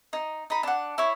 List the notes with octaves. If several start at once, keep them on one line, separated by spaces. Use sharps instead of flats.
D#4
D#4 B5
D4 F#5
E4 C#5